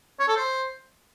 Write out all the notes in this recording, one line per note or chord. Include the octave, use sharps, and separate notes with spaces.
C#5
A4
C5